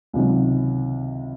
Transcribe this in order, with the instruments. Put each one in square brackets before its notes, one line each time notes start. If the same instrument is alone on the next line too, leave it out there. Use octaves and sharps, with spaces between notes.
[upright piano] C#2 C3 D#3 F#3